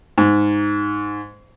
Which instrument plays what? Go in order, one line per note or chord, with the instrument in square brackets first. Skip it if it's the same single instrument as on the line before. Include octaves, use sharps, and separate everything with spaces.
[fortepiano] G#2